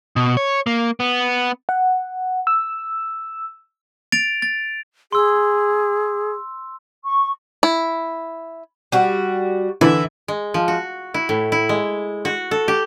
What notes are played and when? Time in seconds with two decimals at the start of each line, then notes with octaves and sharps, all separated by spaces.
0.16 B2
0.37 C#5
0.67 A#3
1.00 B3
1.69 F#5
2.47 E6
4.12 A6 D7 F7
4.42 A6
5.12 G#4 C6 E6
7.04 C#6
7.63 E4
8.92 G3 F#4
9.81 D3 E3 E4
10.28 G#3
10.54 F3
10.68 F#4
11.14 E4
11.29 A2
11.52 E4
11.69 G#3
12.25 F#4
12.51 A4
12.68 G4